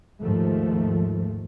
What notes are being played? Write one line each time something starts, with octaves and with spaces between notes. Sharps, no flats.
D#2 G#2 F3 A3